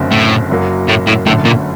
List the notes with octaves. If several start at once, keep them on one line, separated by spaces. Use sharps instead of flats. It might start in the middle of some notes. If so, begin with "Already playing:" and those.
Already playing: F#1 F#2 D3 A3 C4
A2
F#1 F#2 F#3 A#3
A2
A2
G1 F#2 A2 D3 A3
A#2